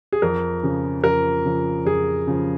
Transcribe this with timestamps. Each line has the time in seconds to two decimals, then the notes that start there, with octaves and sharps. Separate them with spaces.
0.12 G#4
0.22 F2 A#4
0.63 C#3 F3
1.04 F2 A#4
1.45 C#3 F3
1.85 F2 G#4
2.27 C#3 F3